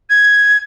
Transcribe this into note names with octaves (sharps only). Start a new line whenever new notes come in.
G#6